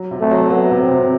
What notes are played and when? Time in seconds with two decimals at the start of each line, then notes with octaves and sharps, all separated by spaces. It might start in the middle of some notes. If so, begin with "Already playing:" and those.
Already playing: F#3
0.11 C3
0.20 A3
0.31 F#3
0.50 F#3 B3
0.71 C3
0.81 C4
0.91 C3